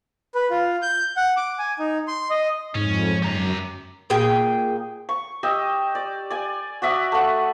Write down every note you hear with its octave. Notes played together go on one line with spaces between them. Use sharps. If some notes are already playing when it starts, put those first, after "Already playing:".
B4
F4
G6
F#5
D6
G#5
D#4
C6
D#5
F2 G#2 C#4
F#2 G4 A#5
A#2 G#4 G5
C#6
G4 D#5 E6
D5
D5 G#5
F#4 D5 E5 D#6
A3 F#5